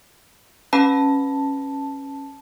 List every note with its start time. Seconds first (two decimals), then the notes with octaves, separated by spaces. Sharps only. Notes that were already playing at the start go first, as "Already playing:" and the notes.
0.73 C#4 B4 A5 B5